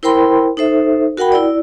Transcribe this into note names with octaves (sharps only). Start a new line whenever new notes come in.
E4 A#4 C5 G5 B5 C6
D#4 A4 C5 E5
F#4 A#4 F#5 G5 B5
E4 D5